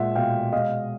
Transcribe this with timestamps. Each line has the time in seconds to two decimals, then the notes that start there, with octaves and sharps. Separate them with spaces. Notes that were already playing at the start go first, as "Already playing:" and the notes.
Already playing: A#2 G#3 E5 F#5
0.15 B2 F5 G5
0.52 G#3 D#5 F5